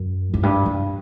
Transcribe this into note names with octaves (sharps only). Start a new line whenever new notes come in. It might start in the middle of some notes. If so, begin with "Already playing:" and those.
Already playing: F#2
F#2
G2
G2